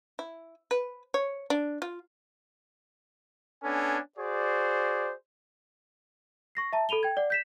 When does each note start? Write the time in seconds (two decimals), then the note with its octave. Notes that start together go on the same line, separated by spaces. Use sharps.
0.19 E4
0.71 B4
1.14 C#5
1.50 D4
1.82 F4
3.64 B3 C#4 D4 A4 G#5
4.18 F#4 G#4 C5 D5
6.55 C#6 A#6 C7
6.73 E5 A5 A#5
6.89 A4 B5 D#7 F7 G7
7.03 G5 G#6
7.17 D5 F#5
7.30 G6 B6 E7